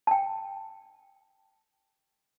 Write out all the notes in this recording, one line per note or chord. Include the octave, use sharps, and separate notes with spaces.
G5 A5